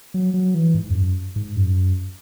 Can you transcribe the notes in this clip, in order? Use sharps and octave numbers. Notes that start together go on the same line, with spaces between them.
F#3
F#3
E3
G#2
E2
F#2
G#2
F#2